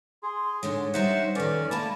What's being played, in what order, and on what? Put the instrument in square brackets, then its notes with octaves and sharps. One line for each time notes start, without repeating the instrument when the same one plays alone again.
[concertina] G#4 [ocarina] C6
[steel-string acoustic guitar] G#2 D3 G#3 [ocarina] C#5
[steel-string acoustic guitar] G3 D#4 E5 [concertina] C5 F#5
[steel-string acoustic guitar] F2 D#3 [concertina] C#4 D5 [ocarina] B4
[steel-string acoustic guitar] A2 G#3 A#3 [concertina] A5 [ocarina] B5